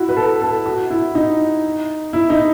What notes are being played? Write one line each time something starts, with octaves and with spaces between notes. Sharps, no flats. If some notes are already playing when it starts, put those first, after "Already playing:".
Already playing: E4 F#4
B4
A4
A4
F#4
E4
D#4
E4
D#4